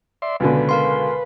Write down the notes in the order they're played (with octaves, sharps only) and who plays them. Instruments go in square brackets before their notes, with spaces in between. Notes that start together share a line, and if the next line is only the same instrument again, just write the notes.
[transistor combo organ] D5 E5 C6
[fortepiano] C#2 B2 D3 [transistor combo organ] B4
[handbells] A#4 F5 C6